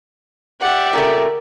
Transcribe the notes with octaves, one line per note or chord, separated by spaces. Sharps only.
G4 D5 E5 F#5
A#2 C#3 A3 A#4